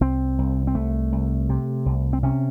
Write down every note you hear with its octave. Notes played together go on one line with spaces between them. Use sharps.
C2 C4
C2
C4
C2 A3
C2
C3
C2
C4
C3 C#4